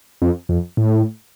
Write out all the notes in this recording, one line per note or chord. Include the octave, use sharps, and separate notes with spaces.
F2
F2
A2